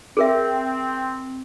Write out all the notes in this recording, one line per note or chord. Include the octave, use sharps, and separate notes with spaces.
C4 G#4 A#4 E5